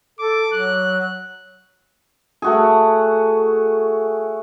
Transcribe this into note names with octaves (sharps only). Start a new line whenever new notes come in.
A4 D6
F#3 F#6
A3 F#4 G#4